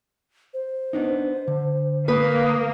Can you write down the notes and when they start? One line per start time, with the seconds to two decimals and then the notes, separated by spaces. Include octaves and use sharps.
0.54 C5
0.93 B3 D4 D#4
1.48 D3
2.08 A#3 B4 D#6